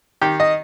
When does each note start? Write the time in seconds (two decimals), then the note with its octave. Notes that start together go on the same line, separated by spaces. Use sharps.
0.22 D#3 G4
0.40 D#5